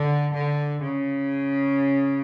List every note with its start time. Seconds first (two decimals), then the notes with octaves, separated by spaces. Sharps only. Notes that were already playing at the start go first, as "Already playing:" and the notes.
Already playing: D3
0.34 D3
0.82 C#3